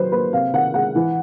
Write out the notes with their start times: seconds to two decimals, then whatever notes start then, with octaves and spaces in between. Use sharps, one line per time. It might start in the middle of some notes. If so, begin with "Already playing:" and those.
Already playing: D#3 F#3 B4 C5
0.12 A#3 B4
0.32 C3 F5
0.53 D#3 F#5
0.74 G#3 F#5
0.95 E3